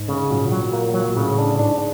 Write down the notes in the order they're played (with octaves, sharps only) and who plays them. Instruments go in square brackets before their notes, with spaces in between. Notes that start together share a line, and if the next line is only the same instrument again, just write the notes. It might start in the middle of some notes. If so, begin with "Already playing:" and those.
Already playing: [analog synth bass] G#2
[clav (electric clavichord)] C#3
[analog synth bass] A#2 [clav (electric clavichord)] F#3
[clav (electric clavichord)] F#3
A#3
F#3
[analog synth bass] A2 [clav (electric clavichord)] C#3
[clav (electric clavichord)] D4
[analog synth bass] G#2 [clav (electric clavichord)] D4